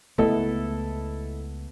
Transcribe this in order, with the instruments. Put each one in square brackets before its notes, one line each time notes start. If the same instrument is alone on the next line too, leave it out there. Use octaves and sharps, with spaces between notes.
[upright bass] C#2 [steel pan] A3 [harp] B3 [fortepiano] E4 A4 D#5